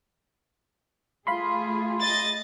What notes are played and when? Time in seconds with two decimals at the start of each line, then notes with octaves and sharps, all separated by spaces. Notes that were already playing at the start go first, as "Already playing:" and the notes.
1.27 A3 F4 G#4 F5 B5 C6
2.01 D#5 A6